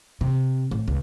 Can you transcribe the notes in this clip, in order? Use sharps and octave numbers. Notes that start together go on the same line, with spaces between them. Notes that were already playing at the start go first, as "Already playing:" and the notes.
C3
A2
C#2